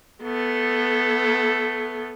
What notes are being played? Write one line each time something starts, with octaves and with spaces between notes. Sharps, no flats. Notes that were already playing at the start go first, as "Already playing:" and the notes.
A3 B3 A4